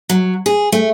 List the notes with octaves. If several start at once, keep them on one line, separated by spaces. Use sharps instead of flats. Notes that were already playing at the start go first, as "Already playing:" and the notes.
F#3
G#4
A3